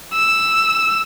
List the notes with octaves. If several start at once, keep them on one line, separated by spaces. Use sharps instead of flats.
E6